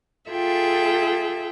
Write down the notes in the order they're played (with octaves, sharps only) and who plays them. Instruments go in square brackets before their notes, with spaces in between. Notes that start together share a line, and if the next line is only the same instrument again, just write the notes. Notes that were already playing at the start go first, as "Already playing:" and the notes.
[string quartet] F4 G#4 A4 E5 G5